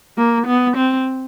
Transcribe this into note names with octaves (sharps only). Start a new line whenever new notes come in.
A#3
B3
C4